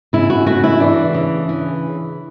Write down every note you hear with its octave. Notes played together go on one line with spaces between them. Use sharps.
C#3 E4
F#4
A3 F#4
E4
E3 D4
C#3
E3